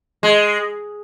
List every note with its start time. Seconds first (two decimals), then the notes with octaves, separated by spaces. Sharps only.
0.23 G#3